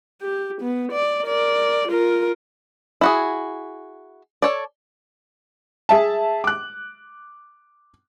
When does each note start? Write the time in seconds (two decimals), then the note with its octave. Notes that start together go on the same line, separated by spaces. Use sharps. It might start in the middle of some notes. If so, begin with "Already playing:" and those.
0.22 G4
0.61 B3
0.92 D5
1.26 A#4 D5
1.88 F4 A#4
3.01 E4 F#4 G#4
4.42 A4 C#5 D5
5.89 G#4 E5 A5
6.44 D6 F#6